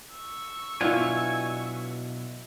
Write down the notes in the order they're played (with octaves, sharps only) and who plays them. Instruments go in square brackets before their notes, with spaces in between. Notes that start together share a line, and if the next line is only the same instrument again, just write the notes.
[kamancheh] C#6 E6
[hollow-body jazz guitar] B2 F#3 F4 [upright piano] D4 E4 [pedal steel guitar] G#5